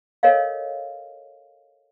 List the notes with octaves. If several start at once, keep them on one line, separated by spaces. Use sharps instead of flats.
A4 A#4 C#5 D#5 F5